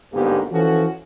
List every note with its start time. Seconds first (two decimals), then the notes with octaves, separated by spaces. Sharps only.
0.14 G1 G#2 B2 A#3 G4
0.51 E3 F3 C#4 F#4 A4